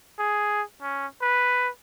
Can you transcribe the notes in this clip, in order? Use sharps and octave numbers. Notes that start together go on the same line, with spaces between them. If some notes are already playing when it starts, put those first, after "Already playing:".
G#4
C#4
B4